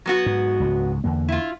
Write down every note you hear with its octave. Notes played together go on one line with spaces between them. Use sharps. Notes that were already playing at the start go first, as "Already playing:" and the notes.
F#3 B3 F#4
G#2
C#2 G#2
E2 D3 A#3
E4 F4